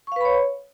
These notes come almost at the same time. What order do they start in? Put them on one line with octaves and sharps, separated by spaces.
C#6 F5 B4 B5 C#5